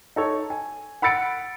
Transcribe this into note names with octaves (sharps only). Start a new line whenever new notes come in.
D#4 A4 C#5
G#5
F#5 B5 E6 A6 C#7 D7